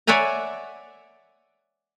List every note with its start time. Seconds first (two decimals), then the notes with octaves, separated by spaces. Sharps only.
0.07 C#5 D5 E5 F#5 G#5 A#5